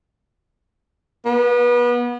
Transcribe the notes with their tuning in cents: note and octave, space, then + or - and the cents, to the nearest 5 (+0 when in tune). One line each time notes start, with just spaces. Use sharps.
B3 -30